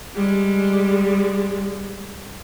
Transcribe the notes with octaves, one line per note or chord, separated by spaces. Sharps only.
G3 G#3